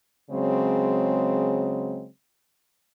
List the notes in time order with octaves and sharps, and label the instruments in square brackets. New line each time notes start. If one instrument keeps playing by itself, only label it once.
[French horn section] C#3 F#3 G#3 C4